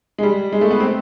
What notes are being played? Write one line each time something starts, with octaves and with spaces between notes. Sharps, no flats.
G#3
G3
G#3
A3
B3
C4